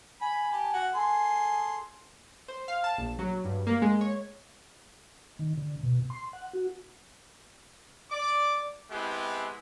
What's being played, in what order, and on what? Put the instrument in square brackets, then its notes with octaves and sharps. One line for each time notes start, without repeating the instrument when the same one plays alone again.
[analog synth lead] G#5 [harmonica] B5
[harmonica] G4 A5
F#4 F#5
[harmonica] G#4 A4 C6 [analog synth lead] G#5
[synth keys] C5
F5
A5
A#1
F#3
G2
A#3
G#3
C#5
[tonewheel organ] D#3
D3
B2
C6
F#5
F#4
[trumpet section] D5 D6
G#3 B3 C4 E4 G4